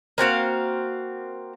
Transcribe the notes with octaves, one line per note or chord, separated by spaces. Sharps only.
A#3 C4 F#4 F5